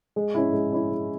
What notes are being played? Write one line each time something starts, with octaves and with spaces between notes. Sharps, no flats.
G#3
C#4 E4
G#3
C#4 E4
G#3